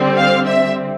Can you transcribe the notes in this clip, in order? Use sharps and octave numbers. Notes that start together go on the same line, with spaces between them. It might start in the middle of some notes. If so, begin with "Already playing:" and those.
Already playing: D3 G3 C4
F5
E5